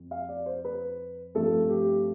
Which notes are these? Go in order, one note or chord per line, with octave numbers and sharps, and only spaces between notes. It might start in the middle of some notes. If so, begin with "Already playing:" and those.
Already playing: F2
F5
D5
C5
B4
G2 F3 A3 C4 A4
G4